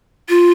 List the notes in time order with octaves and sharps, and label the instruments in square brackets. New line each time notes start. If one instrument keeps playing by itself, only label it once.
[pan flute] F4